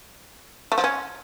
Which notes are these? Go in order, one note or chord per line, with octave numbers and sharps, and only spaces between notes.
A3
F3
C#4